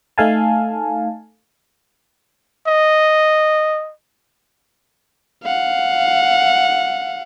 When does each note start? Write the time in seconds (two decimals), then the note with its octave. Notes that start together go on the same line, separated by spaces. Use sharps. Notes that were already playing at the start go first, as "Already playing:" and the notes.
0.18 A3 D#4 A4 F5 G#5 A5
2.67 D#5
5.44 F5 F#5